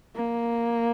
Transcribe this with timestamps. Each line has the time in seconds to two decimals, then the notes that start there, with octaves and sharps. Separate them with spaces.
0.16 A#3